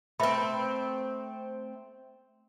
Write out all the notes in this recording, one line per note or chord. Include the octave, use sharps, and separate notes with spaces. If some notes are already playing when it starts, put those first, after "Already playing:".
A3 C4 B4 E5 B5